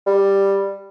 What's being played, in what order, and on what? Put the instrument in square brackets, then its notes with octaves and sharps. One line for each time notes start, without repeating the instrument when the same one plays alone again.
[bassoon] G3